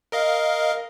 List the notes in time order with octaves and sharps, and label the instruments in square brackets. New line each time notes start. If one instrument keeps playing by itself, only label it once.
[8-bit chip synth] A#4 D#5 F5